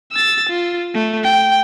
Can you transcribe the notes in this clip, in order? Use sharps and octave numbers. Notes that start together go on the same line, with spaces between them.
E6 A6
F4
A3
G5